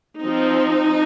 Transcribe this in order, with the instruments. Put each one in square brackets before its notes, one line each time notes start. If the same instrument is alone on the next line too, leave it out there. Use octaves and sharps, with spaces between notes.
[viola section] F3 C4 D#4